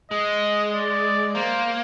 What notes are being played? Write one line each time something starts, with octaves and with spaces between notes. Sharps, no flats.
G#3 D#5
D5
A#3 C5